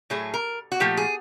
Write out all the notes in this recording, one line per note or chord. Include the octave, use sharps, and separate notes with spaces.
A2 F#3 A3 G#4
A#4
F#4
A#2 F3 A3 G4
G#4